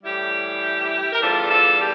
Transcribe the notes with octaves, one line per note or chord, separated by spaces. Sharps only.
A2 E3 G3 E4 G4
A#4
E2 D3 G3 F4 A4
F4 A4
G4